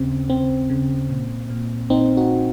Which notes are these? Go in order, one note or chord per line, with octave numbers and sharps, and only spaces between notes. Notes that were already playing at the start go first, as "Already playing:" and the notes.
Already playing: D#2 C#3 C4
C#3 C4
C#3
A#2
A#2
A#1 C4 D#4
D#4 F#4